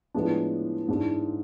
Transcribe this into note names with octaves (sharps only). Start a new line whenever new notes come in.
A2 F3 G#3 B3 D4
G#2 E3 G#3 D4